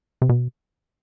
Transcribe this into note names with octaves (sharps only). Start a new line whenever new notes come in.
C3
B2